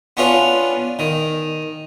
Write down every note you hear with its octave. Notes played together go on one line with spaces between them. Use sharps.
B3 C#4 D4 F4
D#3